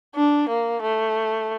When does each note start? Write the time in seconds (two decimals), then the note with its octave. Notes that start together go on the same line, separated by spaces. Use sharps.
0.15 D4
0.49 A#3
0.83 A3